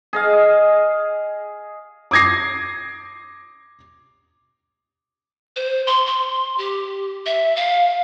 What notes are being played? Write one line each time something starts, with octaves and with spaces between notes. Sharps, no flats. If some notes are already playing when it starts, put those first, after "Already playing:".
G#4 D#5 F5
D6 D#6 G#6 A#6 C7
C5
C6
C6
G4
E5
F5